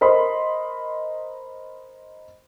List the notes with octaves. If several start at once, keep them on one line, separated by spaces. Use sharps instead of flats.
A#4 C5 D#5 B5 C6